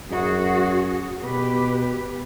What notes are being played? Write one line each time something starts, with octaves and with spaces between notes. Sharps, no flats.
F#2 F#4 G#4
B2 G4 B4